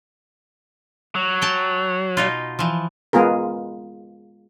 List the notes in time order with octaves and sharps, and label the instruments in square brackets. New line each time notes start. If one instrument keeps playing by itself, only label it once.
[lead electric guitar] F#3
[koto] G5 A5
B2 D#4 F4
E3 F3
[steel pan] G#3 B3 F4 G#4 A#4